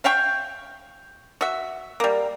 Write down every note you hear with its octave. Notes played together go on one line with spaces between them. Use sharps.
E5 F5 G5 C#6
F#4 E5
G3 A#3